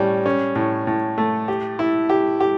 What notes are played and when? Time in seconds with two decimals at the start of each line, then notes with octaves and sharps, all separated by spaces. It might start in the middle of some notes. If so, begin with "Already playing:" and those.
Already playing: A2 G3 C#4
0.26 C#4
0.55 A2
0.87 A2
1.18 A3
1.48 G4
1.79 E4
2.09 G4
2.40 G4